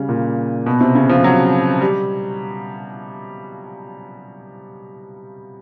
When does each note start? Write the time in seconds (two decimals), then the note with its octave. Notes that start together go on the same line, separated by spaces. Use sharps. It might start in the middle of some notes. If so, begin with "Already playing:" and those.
Already playing: C#3 G3
0.09 A#2
0.66 B2
0.81 C3
0.95 C#3
1.09 F3
1.24 F#3
1.81 G3